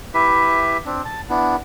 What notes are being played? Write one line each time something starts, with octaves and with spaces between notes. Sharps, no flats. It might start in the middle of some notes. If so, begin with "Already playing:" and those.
E4 G4 B4 E5
C4 D4
A5
B3 D4 E4